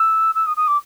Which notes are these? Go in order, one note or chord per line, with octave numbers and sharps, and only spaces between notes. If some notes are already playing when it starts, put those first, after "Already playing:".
Already playing: E6
E6
D#6
D#6
D6